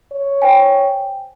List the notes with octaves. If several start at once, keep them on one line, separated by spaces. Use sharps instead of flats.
C#5
C5 G5 G#5